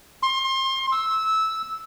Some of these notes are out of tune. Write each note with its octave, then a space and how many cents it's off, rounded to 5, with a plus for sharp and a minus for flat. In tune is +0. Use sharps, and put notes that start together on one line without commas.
C6 +30
E6 -15